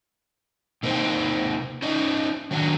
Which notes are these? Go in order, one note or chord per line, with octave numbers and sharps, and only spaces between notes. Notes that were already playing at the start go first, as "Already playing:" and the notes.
C3 A#3 D#4 B4 C5 G5
C#4 D#4 C5 D#5
D#3 F#3 D4